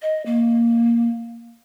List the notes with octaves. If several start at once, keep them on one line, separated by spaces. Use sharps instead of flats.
D#5
A#3